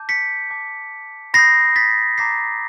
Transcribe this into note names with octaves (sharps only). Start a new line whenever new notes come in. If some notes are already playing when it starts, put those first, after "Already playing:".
Already playing: A5 D6 G6
B6 C#7
A5 D6 G6
B5 D#6 G6 A#6 C7
A6 B6
A#5 D6 G6 A#6 C7